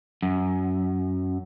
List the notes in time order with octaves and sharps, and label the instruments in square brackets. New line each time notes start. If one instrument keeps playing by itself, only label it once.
[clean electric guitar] F#2